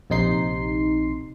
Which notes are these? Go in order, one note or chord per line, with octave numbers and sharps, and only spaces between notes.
A#1 C3 D#4 C6 C7